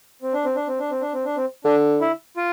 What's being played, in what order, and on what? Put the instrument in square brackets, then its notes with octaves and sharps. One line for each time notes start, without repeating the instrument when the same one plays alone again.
[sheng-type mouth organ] C4
D4
C4
D4
C4
D4
C4
D4
C4
D4
C4
[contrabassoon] D3 [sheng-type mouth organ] D4
[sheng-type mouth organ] E4
F4